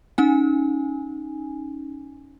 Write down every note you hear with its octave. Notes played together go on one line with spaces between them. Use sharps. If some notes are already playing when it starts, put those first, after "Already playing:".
C#4 D#4 G#5